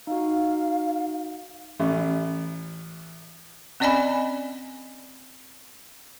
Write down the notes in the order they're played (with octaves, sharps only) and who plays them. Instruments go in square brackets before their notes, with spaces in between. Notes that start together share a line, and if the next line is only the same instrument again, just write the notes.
[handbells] D#4 F#4 [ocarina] F5
[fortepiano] A1
[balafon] C4 C#4 D5 D#5 G#5 B5